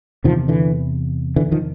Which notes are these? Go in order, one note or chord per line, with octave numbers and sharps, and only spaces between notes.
E2 C3 D#3 F3
D3 E3
D3 E3
D#3 F3